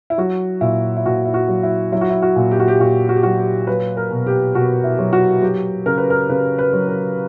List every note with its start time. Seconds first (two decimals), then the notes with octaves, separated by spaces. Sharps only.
0.10 E4
0.18 F#3 F#4
0.61 A#2 E4
0.97 E4
1.06 A#2 F#4
1.25 E4
1.34 F#4
1.48 F#3
1.63 E4
1.92 F#3 E4
2.01 F#4
2.09 E4
2.22 F#4
2.36 A#2
2.51 G4
2.60 F#4
2.68 G4
2.80 A#2 F#4
3.09 F#4
3.16 G4
3.23 F#3 F#4
3.39 G4
3.67 F#3 B4
3.97 A#4
4.11 B2
4.26 G4
4.55 B2 F#4
4.84 E4
4.99 F#3
5.13 F#4
5.42 F#3 G4
5.86 C#3 A#4
5.98 B4
6.10 A#4
6.29 C#3 B4
6.59 B4
6.73 F#3
6.88 A#4